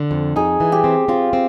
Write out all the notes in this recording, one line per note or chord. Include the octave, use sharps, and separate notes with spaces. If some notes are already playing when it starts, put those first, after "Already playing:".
Already playing: D3
F2
D#4 G#4
E3
G4
C4
C4 F4
C4